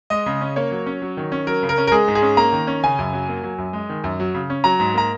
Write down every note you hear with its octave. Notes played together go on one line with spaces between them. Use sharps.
G#3 D#5
C#3
C#4
A#3 C#5
F#3
C#4
F#3
D#3
C#4
F#3 A#4
C#3
A#4
C#4
A#4
G#3 G#4
G#2
G#4
C#4
A#3 A#5
D#3
C#4
C#3 G#5
F#2
F#3
A#3
F#3
F#2
G#3
D#3
F#2
F#3
C#3
C#4
F#3 A#5
G#2
A#3 A#5